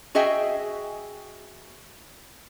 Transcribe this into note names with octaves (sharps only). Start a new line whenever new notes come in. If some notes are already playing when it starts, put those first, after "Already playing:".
F#4 G#4 D#5 E5 G5 G#5